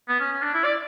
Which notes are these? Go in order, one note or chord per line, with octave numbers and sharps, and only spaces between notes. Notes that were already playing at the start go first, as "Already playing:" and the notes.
B3
C#4
C#4
D4
E4
D5